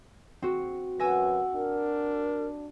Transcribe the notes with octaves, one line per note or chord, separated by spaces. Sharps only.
C4 F#4
F#2 F#4 B4 G#5 E6 A#6
D4 A#4